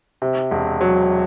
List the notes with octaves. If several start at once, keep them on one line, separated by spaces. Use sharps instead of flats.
C3
E1
F#3